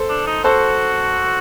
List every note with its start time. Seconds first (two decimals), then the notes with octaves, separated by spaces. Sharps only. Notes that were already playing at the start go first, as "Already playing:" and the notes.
Already playing: A4 C5
0.09 D4
0.27 D#4
0.44 F#4 A4 C5